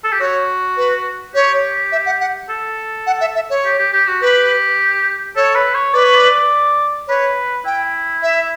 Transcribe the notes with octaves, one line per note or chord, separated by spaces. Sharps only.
A4
G4
F#4 C#5
B4
G4 C#5
E5
F#5
F#5
A4
F#5
E5
E5
C#5
G4
G4
G4
F#4
G4 B4
A4 C#5
B4
C#5
B4 D5
C#5
D5
B4 C#5
E4 G5
E5